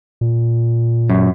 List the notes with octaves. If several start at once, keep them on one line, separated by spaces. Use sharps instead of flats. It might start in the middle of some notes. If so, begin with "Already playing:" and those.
A#2
F#2